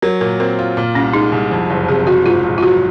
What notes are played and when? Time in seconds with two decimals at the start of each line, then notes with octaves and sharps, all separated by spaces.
0.02 F#3 A#4
0.21 A#2 A#4
0.40 C4 A#4
0.59 F4
0.77 A#2
0.95 C2 C#4
1.13 G#3 D#4
1.32 C2
1.51 F2
1.70 F#1
1.88 C3 G#4
2.07 F#1 F#4
2.26 G#2 F4
2.44 A#1
2.58 F4
2.63 F#3 F#4